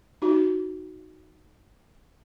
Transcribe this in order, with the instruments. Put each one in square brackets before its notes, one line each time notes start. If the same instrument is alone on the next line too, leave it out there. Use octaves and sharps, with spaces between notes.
[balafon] D#4 F#4